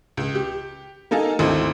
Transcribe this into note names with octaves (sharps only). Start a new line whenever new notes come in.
C#2
G4
A#3 D#4 A4 F5 G#5
G#1 D2 E4 A4 C5 D#5